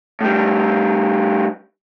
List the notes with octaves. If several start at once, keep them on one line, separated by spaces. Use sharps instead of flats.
A2 G3